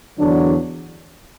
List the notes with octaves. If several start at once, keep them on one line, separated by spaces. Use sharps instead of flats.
E2 D3 F#3 D4